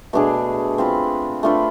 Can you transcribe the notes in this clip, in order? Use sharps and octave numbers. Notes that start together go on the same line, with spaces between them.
B2 A3 D4 G#4
C4 F4 B4
A3 D4 F4 B4